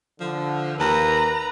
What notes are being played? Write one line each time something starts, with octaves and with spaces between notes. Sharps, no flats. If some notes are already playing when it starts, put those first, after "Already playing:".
D3 F3
D#2 A#3 A#4 B4 A#5